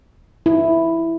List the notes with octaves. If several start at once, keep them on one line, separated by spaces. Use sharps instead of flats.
E4